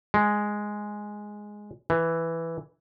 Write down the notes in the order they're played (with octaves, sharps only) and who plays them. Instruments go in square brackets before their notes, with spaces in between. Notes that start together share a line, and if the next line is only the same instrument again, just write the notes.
[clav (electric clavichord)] G#3
E3